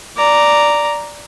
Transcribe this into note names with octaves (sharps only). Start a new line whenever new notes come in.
D5 A#5